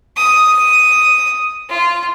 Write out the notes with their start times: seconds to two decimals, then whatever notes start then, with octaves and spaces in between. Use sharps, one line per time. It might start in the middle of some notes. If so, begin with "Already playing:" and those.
0.17 D#6
1.69 F4